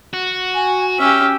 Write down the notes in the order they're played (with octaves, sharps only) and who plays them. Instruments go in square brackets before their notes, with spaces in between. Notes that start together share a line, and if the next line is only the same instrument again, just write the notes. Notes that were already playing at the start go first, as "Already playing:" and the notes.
[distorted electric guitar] F#4
[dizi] G#5
[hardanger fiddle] C#4 G4 [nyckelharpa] E5 [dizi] F6